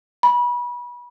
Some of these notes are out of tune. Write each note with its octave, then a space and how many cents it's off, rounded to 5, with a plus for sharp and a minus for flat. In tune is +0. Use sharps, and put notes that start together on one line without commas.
B5 -30